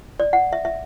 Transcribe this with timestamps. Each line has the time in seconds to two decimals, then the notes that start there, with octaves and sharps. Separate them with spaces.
0.20 D5
0.33 F#5
0.53 E5
0.65 E5